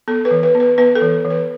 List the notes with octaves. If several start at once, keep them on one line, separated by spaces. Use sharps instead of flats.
B3 A4
B4
E3
B4
B3
B4
B3 B4
A4
E3
E3
B4